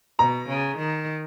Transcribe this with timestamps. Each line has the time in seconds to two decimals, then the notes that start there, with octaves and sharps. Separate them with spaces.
0.19 B2 A#5
0.48 C#3
0.78 D#3